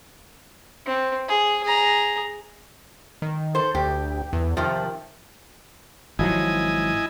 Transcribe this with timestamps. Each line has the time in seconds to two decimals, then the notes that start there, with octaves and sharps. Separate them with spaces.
0.87 C4
1.28 G#4
1.64 G#4 A#5
3.22 D#3
3.55 A4 C5
3.75 D2 G4
4.33 E2
4.57 C3 D#3 F3
6.19 G#1 F3 F#3 E4 D#5 G#5